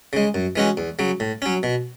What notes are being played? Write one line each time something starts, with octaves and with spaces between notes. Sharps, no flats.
C#3 G#3
F#2
E3 G#3 C#4 F#4
E2
C#3 F#3
A2
F#3 C#4
B2